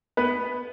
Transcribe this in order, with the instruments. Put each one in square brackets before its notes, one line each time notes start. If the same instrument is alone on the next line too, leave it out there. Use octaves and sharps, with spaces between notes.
[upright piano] B3 B4